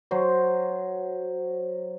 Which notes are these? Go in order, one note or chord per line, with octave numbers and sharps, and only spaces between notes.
F#3 C5